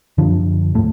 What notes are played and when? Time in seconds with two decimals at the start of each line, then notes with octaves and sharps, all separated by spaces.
0.18 F#2 D3 F3 D4
0.74 D1 G#2 A3